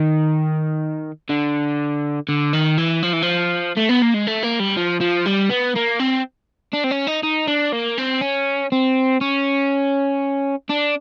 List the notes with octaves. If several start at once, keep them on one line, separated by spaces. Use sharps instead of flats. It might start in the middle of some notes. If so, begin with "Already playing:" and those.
Already playing: D#3
D3
D3
D#3
E3
F3
E3
F3
A3
B3
A#3
G#3
A3
A#3
G3
F3
F3
G3
B3
A#3
C4
D4
C4
C#4
D#4
D#4
D4
A#3
C4
C#4
C4
C#4
D4